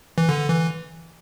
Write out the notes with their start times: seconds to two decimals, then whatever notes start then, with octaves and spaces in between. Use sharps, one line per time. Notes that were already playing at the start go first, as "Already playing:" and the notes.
0.18 E3
0.29 D3
0.49 E3